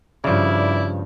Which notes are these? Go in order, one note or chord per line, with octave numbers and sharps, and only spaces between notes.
G2 C#3 F3 E4 D5